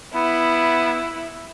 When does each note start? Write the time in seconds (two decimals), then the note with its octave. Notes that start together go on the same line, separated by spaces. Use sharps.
0.15 B3 E4